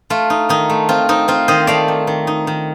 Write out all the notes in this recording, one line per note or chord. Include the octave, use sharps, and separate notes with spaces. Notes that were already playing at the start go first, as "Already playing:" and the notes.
A3 F4
D#4
D#3 D#4
A3
C4 F4
C4 D#4
C4 F4
D#3 C5 D#5
A3 D5 F5
D#4
D#3
D#4
D#3